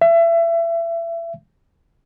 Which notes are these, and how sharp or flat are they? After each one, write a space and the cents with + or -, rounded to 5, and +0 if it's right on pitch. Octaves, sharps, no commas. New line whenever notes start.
E5 +30